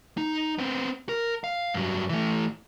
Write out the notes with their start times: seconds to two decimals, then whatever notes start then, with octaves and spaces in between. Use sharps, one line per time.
0.17 D#4
0.59 B3 C4
1.09 A#4
1.44 F5
1.74 G2 F#3
2.09 E3 A3